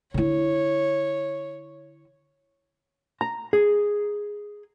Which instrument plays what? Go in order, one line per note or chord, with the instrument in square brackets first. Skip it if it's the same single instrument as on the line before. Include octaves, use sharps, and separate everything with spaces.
[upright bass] D3 E4 [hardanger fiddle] C#5
[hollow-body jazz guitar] A#5
G#4